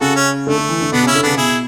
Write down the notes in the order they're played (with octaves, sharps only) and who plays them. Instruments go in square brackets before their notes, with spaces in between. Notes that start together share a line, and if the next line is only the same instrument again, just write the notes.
[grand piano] C#3 [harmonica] F#4 A4
[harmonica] C#4
[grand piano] D3 [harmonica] A3
[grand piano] D3
E3
D3
[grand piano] B2 [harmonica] B3 D4
[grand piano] C#3 [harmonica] C#4 E4
[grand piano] D3
[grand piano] C#3 [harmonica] B3 D4
[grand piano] C#3
[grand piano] B2 [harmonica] E4 G#4